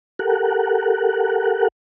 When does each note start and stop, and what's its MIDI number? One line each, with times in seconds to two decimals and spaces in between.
0.19 1.68 67
0.19 1.68 69
0.19 1.68 70
0.19 1.68 78